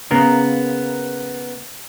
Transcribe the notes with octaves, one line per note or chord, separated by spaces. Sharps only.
C#3 A#3 B3 A#4